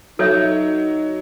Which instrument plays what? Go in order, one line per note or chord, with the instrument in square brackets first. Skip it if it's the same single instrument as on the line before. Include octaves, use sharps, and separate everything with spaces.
[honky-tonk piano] F#3 [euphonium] D#4 [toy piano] A4 C#5 E5